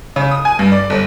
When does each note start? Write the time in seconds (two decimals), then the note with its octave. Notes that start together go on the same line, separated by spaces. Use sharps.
0.16 C#3
0.31 D#6
0.45 G#5
0.59 G2
0.72 D5
0.90 G1